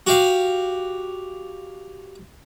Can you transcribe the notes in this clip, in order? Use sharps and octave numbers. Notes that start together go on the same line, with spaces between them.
F#4 G4 F5